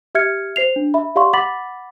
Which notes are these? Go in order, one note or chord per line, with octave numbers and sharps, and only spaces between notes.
G4 E5 F6 G#6 C#7
C5 C7 F7
D4
E5 B5
G4 D5 F5 F#5 C6 C#6
F#5 B5 D6 A6 B6 F#7